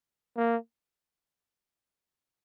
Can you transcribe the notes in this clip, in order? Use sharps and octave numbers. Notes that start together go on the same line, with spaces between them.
A#3